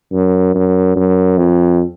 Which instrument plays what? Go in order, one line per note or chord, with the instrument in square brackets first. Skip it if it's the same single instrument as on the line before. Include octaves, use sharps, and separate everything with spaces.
[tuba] F#2
F#2
F#2
F2